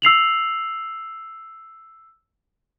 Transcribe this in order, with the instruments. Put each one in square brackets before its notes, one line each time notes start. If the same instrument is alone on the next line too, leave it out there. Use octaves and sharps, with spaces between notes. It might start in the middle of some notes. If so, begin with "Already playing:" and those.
[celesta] E6 C7 F7 F#7